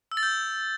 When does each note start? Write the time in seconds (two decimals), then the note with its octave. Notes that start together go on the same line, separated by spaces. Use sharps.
0.12 E6
0.17 A6
0.23 G6